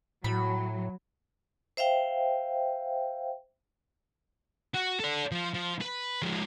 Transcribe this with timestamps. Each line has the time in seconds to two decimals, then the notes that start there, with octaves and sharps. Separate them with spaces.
0.24 A2 F#3 B5
1.77 C5 E5 F5 G5
4.75 F#4
5.00 A4 D5
5.32 F3
5.54 F3
5.81 B4
6.22 F3 G#3